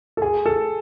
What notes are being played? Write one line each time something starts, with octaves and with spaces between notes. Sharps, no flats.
A4
G#4
A4